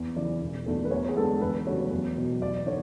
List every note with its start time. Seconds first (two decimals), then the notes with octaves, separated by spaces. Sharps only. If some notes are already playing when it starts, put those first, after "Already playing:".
Already playing: E2
0.16 C#3 E3 D5
0.41 E1
0.66 E2 B2 A3 D4
0.85 B4
0.91 E2 C#5
1.09 G#4
1.16 D3 G#3 B3 D4 A4
1.41 E2 B4
1.66 C#3 F#3 A3 D4 C#5
1.91 E2
2.16 B2 F#3
2.41 E2 D5
2.67 D3 C#5